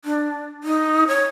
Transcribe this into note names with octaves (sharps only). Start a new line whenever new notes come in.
D4
D#4
C#5